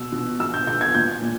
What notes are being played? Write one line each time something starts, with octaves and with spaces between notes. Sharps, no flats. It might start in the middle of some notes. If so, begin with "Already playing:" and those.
Already playing: B2 E6
B2
B2 E6
G6
B2 G6
G#6
A#2 G6
A#2